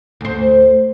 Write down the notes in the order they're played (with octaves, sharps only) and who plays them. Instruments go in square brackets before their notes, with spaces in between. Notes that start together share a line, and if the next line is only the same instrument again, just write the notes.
[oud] D2 C5